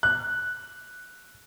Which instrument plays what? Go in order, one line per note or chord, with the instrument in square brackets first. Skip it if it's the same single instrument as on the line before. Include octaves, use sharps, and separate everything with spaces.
[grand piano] F#6